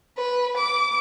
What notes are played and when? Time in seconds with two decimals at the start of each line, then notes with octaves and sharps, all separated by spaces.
0.18 B4
0.57 D6